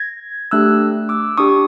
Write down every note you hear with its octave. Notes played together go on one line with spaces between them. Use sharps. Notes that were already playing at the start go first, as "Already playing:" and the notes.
Already playing: G#6 A#6
A3 D4 G4 E6 F#6
D6 E6
D4 G4 C#6 D#6